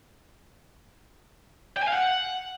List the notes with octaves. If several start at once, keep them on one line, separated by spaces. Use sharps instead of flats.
G5
G#5
F5
F#5